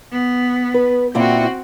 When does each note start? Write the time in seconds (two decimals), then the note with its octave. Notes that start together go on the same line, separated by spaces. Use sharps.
0.12 B3
0.74 B4
1.15 A#2 C4 E4 F#4 G5